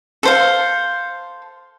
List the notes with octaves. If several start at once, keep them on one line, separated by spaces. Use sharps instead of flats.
A4 C5 F5